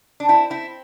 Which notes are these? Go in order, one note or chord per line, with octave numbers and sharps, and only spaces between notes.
D4
C4 E4
C4 E4